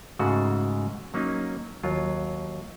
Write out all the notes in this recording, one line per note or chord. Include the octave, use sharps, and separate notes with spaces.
G#2 C#3 G#3 A3 F#4
F#3 A#3 C#4 D#4
D#2 F#3 F4